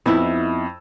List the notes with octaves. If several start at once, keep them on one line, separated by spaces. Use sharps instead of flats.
F2 B3 D#4 E4 E6